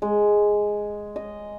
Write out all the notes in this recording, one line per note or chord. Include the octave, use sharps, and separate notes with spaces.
G#3
D#5